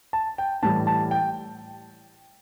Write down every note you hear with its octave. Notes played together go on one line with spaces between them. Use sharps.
A5
G5
A2 E3 G3 A5
A5
G5